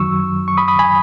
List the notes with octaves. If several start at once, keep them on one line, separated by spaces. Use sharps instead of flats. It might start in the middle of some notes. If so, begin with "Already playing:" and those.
Already playing: F#2 D#3 F#3 C#6 E6
C#6
B5 D#6
B5 D#6
G#5 B5